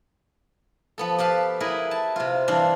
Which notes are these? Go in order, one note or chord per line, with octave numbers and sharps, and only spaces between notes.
F3 B3 A4
G4 B4 F5 A5
E4 G#4 A#4 B4
A5
C3 F4
G2 E3 C4 D4 F5